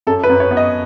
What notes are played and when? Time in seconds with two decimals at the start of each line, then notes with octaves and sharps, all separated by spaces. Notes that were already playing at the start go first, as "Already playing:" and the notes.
0.07 F#2 A4
0.23 B4
0.30 F#2
0.40 C#5
0.51 B3
0.57 D#5